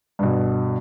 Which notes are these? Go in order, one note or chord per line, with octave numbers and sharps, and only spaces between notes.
G2 B2